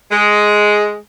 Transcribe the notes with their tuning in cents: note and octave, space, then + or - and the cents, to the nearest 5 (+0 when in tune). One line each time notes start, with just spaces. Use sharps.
G#3 +5